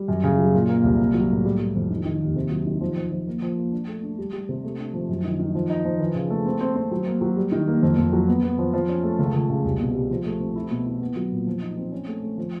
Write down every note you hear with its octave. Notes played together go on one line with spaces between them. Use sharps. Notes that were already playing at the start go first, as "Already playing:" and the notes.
Already playing: G3
F#2
C#3
F#3
A#2
A#3
C2
A#3
F#3
A2
G3
G3
F2
D#3
D#3
D#2
C3
F#3
D#3
F3
F3
F3
A#3
F3
A#3
D4
A3
D4
G3
G3
C3
A3
D4
F3
F#2
D#3
D#3
F3
D#4
F3
E3
C#3
A3
C4
C4
C4
F#3
A#3
F#3
G3
D#3
A#3
F2
F2
F#3
B3
B3
F3
F3
C#4
A3
C#2
C#2
C#3
C2
B2
G3
F3
A3
C4
E4
B2
E4
B3
F#3
A#2
F3
D#4
C4
C#4
A3
A3
F3